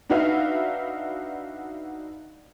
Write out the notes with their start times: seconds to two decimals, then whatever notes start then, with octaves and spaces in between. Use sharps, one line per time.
0.10 D4 D#4 F#4 B4 E5 F5